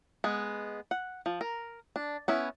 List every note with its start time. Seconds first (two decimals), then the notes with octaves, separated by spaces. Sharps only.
0.24 G#3 B3
0.91 F#5
1.26 F3
1.41 A#4
1.96 D4
2.28 B3 C#4 E4